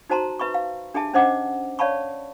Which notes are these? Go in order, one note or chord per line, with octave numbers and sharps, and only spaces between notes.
D#4 F#4 C5 A5 A#5 C6
B4 E5 B5 C#6
F5
D4 G4 G#4 E5 A5
C#4 D4 C5 D#5 F#5 D6
C#5 D5 F5 A5 B5 C#6